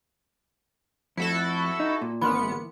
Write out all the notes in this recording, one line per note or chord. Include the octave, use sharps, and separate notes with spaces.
F2 A3 E4 F#4 A4
D#4
A#2
G#1 E3 A#3 B3 B5 C6 F6 C#7